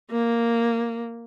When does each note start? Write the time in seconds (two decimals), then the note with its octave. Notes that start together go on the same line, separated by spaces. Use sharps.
0.11 A#3